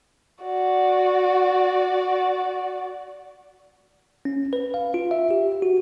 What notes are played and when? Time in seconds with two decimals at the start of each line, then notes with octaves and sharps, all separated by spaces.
0.43 F#4 D5
4.25 C#4
4.53 B4
4.74 F5
4.94 F4
5.11 E5
5.31 G4
5.62 F#4